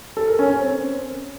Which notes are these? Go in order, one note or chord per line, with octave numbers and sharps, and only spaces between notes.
A4
A#4
C#4
C#4
C4